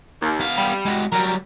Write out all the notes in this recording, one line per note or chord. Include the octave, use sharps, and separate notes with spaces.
D#2
B3 F5
G3
G#3 F#4
F#3 G3 A#4